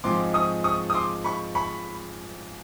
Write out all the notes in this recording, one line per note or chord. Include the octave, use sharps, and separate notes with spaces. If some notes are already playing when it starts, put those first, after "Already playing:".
G#2 F3 G#3 C4 C6 D6
C#6 D#6
C#6 D#6
D#6
C6 D6
B5 C#6
B5 C#6